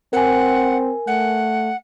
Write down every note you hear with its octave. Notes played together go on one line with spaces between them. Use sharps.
C4 A#4 F#5 G#5
A3 F#5